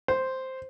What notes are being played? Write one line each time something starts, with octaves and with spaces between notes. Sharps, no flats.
C5